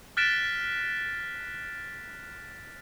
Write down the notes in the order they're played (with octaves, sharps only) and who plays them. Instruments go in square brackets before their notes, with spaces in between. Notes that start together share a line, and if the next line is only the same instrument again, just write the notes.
[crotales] F6 F#6 A6 B6 D7 E7